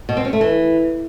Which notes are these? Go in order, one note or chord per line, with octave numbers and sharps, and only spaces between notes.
B2
C4
C#4
A3
E3